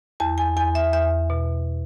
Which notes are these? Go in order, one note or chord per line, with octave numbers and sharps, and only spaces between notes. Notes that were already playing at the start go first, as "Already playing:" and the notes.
E2 A5
G#5
E2 G#5
E5
E2 E5
B2